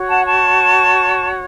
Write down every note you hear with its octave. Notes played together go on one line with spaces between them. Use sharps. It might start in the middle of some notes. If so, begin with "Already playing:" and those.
Already playing: F#4 C#5
F#5 A5
A5 C#6